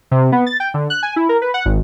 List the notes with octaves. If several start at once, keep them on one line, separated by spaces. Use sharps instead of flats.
C3
B3
A6
G5
D3
F#6
G#5
E4
A#4
B4
F#5
G#1